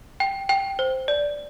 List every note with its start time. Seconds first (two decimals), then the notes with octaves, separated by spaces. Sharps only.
0.20 G5
0.49 G5
0.79 C5
1.08 D5